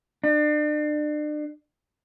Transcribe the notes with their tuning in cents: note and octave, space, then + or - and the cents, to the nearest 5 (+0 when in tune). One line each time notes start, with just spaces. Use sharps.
D4 +35